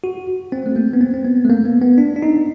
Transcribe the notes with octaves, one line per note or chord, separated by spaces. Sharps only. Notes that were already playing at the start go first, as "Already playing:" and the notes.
F#4
C4
A3
A#3
B3
C4
C4
B3
A3
A#3
B3
B3
D4
D4
D#4